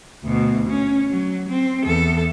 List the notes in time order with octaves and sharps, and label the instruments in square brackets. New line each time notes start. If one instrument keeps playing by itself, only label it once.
[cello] D2 B2
C#4
F#3
C4
E2 A4